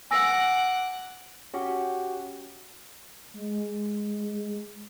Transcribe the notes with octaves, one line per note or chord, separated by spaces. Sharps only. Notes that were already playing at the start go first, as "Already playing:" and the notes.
F#5 G#5 D6 E6 A#6
C#4 F#4 G4
G#3